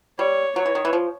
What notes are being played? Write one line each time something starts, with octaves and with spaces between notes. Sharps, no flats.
G3 C#5
F#3 C#5
E3
D#3
E3
F3